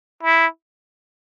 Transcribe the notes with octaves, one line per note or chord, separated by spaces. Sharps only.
E4